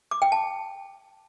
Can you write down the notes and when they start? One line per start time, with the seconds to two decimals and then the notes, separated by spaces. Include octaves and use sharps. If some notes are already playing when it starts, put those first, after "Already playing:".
0.11 D6
0.22 G5
0.32 A5